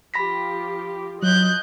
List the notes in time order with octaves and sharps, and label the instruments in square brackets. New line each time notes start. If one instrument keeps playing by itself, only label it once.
[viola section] F3 F4 G4 [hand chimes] B5 A#6 B6
[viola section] F3 D#5 [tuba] F#3 [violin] F#6 G6